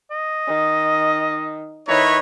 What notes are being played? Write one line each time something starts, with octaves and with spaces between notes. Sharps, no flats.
D#5
D#3
D#3 E4 B4 C#5 A#5